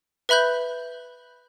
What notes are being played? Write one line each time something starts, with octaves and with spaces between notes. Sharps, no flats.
B4 E5 B5 F#6 G6